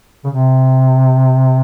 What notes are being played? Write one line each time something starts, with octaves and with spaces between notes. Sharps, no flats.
C#3
C3